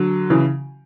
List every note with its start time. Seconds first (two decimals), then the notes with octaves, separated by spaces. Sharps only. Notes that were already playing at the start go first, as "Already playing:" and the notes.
Already playing: D3 F#3
0.30 C#3 E3